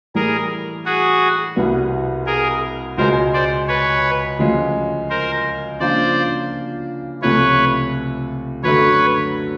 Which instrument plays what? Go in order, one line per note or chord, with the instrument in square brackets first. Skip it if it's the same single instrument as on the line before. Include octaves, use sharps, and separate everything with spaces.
[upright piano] A2 E3 G3 [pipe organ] G#4 A#4
[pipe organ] F#4 G#4
[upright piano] C2 B2 G3 B3
[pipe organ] G#4 A#4
[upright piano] C#2 B2 G#3 [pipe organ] A#4 C5
[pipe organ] C5 D5
B4 C#5
[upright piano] D2 C#3 F3 G#3
[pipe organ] A#4 C5
[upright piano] C#3 F3 A#3 D4 F4 [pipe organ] C5 D5
[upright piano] C#2 C3 F3 A3 [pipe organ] B4 C#5
[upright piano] F#2 D3 F#3 A3 [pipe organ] B4 C#5